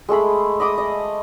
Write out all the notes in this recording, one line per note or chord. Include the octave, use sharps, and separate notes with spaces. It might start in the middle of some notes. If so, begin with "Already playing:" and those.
G#3 A3 G#4 B5
D#5 B5 D6 D#6
D#5